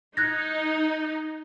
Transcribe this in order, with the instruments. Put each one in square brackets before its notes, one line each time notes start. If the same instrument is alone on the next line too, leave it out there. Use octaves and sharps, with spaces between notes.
[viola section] D#4 [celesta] F#6 G#6 A#6